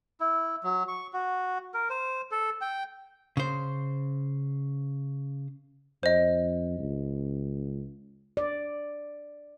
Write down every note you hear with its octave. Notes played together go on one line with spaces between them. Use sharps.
E4
F#3
C#6
F#4
A#4
C5
A4
G5
C#3 C5
F2 C5 D#5
C#2
D5